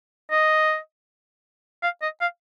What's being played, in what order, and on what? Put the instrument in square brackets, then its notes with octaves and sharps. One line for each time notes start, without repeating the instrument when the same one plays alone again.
[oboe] D#5
F5
D#5
F5